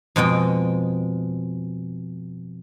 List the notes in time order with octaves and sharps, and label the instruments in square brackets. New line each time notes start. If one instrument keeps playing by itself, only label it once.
[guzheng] F2 B2 G#3 G5